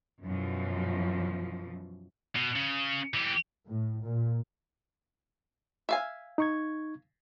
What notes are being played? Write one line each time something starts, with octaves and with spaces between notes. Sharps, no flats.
F#2 B2 E3 F3
B2
C#3
E3 G4
A2
A#2
E5 F5 G#5
D#4 C#6 G#6